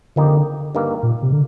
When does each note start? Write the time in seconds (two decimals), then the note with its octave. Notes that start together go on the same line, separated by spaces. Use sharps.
0.16 F2 D3 D#3 A#3 D#4 G4
0.75 G2 D#3 A#3
1.03 A#2
1.22 C3
1.32 D3